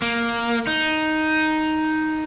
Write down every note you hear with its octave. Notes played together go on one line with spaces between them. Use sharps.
A#3
D#4